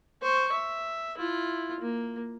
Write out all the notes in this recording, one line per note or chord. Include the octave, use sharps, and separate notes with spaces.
C5 C#6
E5
E4 F4
A#3